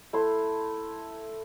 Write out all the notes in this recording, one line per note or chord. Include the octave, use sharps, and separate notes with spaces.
A3 E4 C6